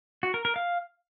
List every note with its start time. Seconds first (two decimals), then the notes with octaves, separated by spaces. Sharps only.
0.23 F#4
0.34 A#4
0.45 A#4
0.56 F5